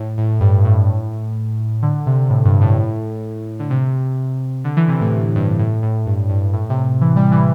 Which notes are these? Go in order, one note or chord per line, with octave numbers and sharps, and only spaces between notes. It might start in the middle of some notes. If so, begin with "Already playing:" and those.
Already playing: A2
A2
G2
A2
D3
C3
A2
G2
A2
D3
C3
D3
E3
C3
A2
G2
A2
A2
G2
G2
A2
C3
E3
G3
E3